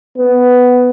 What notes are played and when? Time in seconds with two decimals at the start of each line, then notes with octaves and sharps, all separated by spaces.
0.18 B3